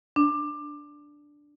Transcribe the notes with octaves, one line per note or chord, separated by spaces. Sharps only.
D4